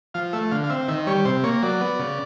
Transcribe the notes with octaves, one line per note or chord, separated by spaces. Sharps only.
F3 F5
A3 E5
D3 F5
F5
C4 E5
D#3 E5
G3 C#5
C3 C5
A#3 C#5
F#3 D5
B3
C#3